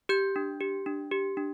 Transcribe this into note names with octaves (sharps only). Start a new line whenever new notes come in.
G4 G6
D4
G4
D4
G4
D4